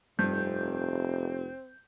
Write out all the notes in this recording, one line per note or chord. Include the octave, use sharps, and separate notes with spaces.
F1 G2 C4 G6